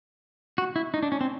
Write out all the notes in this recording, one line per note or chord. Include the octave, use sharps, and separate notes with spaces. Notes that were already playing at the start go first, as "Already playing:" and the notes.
F#4
E4
D#4
D4
C#4
C4